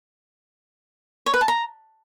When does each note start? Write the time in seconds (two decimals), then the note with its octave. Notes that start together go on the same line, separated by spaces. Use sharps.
1.26 C#5
1.34 B4
1.41 A5
1.48 A#5